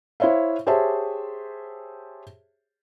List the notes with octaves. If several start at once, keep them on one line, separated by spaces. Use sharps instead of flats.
E4 C5 C#5 E5 F5
G4 G#4 C5 C#5 E5 A5